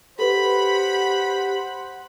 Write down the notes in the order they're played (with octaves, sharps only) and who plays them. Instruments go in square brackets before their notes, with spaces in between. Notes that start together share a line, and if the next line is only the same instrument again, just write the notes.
[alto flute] G4 [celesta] A4 B4 [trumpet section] C5 F#5 [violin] B5